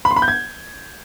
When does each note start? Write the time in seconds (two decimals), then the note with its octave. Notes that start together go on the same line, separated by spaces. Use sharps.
0.05 B5
0.11 C6
0.16 B5
0.22 G6
0.28 G#6